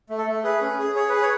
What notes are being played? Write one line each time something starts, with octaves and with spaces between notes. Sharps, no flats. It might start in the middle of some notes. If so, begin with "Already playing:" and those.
A3
A4
A3
G#4 B4
C#4
G#4
G#4 C#5
G#4 B4
C#5